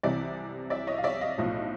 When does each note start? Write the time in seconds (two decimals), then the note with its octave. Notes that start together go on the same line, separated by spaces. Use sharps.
0.03 C2 C3 E3 G3 D5 E5
0.70 D5 E5
0.87 C#5 D#5
0.98 F5
1.04 D5 E5
1.21 D#5 F5
1.38 B1 A2 F3 A3